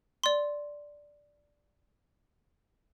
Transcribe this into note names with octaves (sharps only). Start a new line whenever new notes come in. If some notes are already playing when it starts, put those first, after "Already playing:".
D5 C6